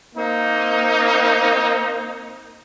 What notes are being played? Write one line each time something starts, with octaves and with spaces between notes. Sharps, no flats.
A#3 C4 D#4